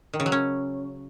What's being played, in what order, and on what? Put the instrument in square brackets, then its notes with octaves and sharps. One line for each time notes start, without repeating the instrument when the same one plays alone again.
[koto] D#3
C#3
F#3
C#4